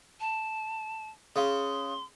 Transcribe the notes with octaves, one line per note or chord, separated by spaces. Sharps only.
A5
C#3 C6